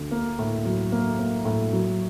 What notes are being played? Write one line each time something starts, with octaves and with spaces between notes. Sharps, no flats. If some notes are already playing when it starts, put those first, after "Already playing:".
Already playing: D2
A#3
A2
F#3
A#3
A#3
A2
F#3